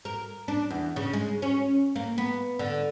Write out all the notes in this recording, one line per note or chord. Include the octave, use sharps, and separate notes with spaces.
A#4
D4
E2
C#3
G#3
C#4
A#3
B3
D3